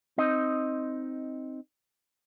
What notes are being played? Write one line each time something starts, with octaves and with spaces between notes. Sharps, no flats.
C4 D#4 D#5